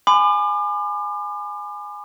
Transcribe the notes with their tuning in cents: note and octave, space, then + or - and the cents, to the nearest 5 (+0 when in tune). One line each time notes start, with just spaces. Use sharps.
G#5 +0 B5 +35 D6 +40